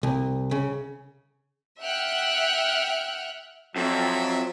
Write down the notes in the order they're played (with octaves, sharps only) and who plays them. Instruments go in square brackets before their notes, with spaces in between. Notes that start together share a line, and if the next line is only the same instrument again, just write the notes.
[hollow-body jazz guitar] C2
C#3
[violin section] E5 F#5 G5 F6 F#6
[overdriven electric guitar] F2 [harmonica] F#3 E5